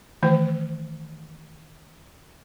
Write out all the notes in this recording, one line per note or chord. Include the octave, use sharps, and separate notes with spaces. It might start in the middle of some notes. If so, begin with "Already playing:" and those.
D#3 E3 A3 C5 G5